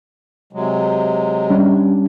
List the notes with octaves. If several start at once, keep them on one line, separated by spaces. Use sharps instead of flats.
C3 F#3 G#3
G3 C#4 D4